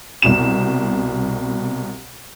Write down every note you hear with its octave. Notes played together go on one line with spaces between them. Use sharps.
C2 B2 E7